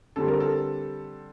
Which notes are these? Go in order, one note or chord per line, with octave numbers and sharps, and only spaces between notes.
D3 G3 C4 A4
A#4
A4